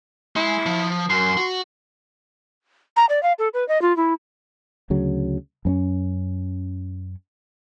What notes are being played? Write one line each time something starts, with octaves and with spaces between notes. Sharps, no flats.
G#3 E4 C6
F3
F#2 C6
F#4
A#5
D5
F5
A4
B4
D#5
F4
E4
D2 C#3 F#3
F#2 C4 C#4